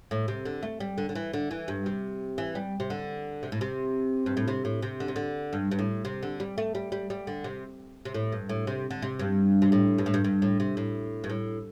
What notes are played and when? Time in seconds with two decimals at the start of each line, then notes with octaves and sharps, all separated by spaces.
0.11 A2
0.28 C3
0.45 D3
0.63 A3
0.80 G3
0.98 D3
1.09 D3
1.15 E3
1.33 D3
1.51 E3
1.68 G2
1.86 C3
2.38 E3
2.55 G3
2.80 C3
2.90 D3
3.43 C3
3.52 A2
3.61 C3
4.26 G2
4.37 A2
4.48 C3
4.65 A2
4.82 C3
5.00 D3
5.08 C3
5.16 D3
5.53 G2
5.71 G2
5.79 A2
6.05 C3
6.23 D3
6.40 G3
6.58 A3
6.75 G3
6.92 G3
7.10 G3
7.27 D3
7.44 C3
8.05 C3
8.14 A2
8.32 G2
8.49 A2
8.67 C3
8.91 D3
9.02 C3
9.19 G2
9.62 C3
9.72 A2
9.98 G2
10.06 A2
10.14 G2
10.24 G2
10.42 A2
10.60 C3
10.77 A2
11.24 G2
11.30 A2